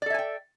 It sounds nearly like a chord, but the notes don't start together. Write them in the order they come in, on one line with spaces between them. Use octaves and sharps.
D5 A4 E5 G#5 G5